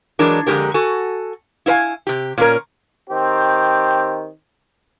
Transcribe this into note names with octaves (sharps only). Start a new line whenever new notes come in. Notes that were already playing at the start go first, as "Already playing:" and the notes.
E3 F#3 G#3 D4 A#4
F2 D3 G#3 C#4 G4 A#4
F#4 A4 G#5
E4 F4 B4 F5 G#5
C3 G4
A#2 C#4 A#4
D#3 C4 G4